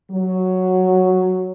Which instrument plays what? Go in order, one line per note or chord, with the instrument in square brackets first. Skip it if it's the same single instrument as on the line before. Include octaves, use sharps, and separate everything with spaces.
[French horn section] F#3